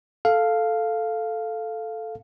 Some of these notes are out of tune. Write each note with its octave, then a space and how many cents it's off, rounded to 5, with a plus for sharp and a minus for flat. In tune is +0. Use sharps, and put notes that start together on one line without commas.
A4 +0 F5 +0